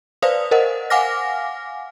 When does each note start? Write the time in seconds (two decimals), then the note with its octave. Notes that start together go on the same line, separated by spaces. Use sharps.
0.22 B4 C5 D5 F5 D#6 F7
0.51 A#4 C5 D#5 F#5
0.90 F5 F#5 G#5 D6 F6 A#6